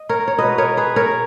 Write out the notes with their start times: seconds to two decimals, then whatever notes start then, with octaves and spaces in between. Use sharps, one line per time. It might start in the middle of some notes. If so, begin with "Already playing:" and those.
Already playing: D#5
0.09 A#4 C#5
0.28 C#5
0.38 B2 G#3 B3 B4 D#5
0.58 A#4 C#5
0.77 G#4 B4
0.96 A#4 C#5